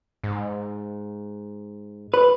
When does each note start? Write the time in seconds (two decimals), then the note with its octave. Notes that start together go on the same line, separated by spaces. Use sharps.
0.23 G#2
2.14 B4